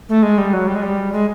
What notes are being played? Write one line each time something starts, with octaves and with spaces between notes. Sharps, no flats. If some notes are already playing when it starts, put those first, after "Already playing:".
A3
G#3
G3
F#3
G3
G#3
G3
G#3